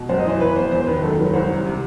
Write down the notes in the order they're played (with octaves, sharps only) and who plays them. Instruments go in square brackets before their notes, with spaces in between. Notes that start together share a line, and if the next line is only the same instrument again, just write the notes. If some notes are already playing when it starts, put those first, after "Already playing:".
Already playing: [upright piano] B2
[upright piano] F#2 [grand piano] C5
[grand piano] D#5
[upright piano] E3 [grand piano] C5
[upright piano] E3 [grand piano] B4
[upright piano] B3 [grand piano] C5
[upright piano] E2 [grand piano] C5
[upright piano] D#3 [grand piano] B4
[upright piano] F#2 [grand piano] A4
[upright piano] F#3 [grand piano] B4
[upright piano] C2 [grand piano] C5
[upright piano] C3
C3